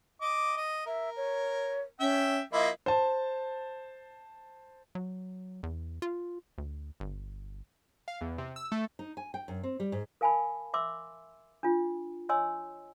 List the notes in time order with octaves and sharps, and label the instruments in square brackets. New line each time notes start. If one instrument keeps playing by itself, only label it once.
[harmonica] D#5 D6
D#5
[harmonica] A#4 [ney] E5
[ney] C#5
[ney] C#4 [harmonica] E5 G5 E6
[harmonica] F3 A#3 E4 [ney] D#5
[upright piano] C5 A5
[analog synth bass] F#3
E2
F4
D2
G1
[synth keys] F5
E2
C3
E6
A3
[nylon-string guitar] D#4
G#5
G5
F#2
C4
G3
G#2
[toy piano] A#4 F5 G#5 A5 B5
E5 C6 D6 E6
D4 F4
C#5 D#5 G#5 C6 E6